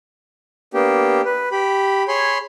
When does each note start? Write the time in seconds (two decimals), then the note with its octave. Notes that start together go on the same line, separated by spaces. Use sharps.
0.74 A#3 B3 D4 G4
1.25 B4
1.52 G4 B5
2.08 G#4 C#5 B5 C6